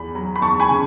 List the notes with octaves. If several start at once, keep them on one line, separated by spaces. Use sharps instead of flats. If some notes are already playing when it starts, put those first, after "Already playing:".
Already playing: E2 B5
F#3
B5
E2 A5 C#6
G#5 B5
C#3